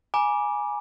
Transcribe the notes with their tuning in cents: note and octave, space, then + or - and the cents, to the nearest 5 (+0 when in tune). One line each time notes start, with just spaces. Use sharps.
G#5 +0 B5 -45 D6 +0